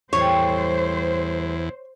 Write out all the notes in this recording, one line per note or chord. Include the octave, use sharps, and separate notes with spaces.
E2 A2 G3 C5 C#5